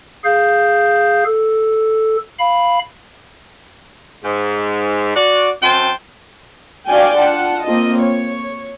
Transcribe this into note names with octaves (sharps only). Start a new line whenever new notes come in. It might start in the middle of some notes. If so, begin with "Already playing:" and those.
G#4 F5 G6
A4
F5 B5
G#2
F#4 D5
F#2 C4 G5 A5 C6
D4 F#4 D5 F5 G5 G#5
F4 F#5 A5
A#3 C4 F4 D#5
C#5